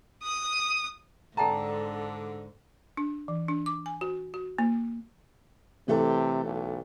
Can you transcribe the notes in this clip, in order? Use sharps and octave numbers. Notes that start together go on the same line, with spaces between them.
D#6
G#2 D3 A4 G5 A5 A#5
D4
E3
D4
D6
G#5
F#4
F#4
A#3
C3 E3 A3 A4
B1